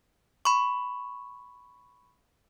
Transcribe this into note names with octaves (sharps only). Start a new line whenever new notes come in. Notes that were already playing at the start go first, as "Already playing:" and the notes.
B5 C#6